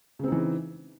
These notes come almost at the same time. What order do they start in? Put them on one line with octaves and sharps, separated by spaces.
C#3 C4 D#4 E3